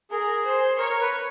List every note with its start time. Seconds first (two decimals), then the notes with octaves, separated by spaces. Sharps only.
0.10 G#4 A#4
0.45 C5
0.78 A#4 C#5
0.91 A#4
1.01 B4